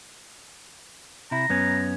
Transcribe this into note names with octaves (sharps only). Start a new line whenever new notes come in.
C3 E4 A#5
F#2 B3 C#4